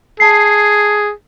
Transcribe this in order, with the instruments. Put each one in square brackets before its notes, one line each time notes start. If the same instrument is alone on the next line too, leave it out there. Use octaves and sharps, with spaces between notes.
[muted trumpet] G#4 [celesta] A5 C7